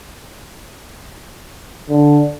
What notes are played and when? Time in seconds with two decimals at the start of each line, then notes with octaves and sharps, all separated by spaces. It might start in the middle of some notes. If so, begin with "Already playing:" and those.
1.89 D3